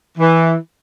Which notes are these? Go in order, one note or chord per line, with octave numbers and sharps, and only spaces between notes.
E3